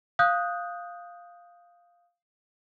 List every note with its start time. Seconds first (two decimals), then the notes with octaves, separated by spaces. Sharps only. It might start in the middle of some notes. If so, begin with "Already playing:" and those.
0.19 F5 D#6 F#6 G6